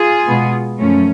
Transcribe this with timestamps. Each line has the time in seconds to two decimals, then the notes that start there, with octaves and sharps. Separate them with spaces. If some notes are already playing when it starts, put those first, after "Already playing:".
Already playing: F4 G#4
0.27 B2 G#3 B3
0.79 F#2 F3 A3 C#4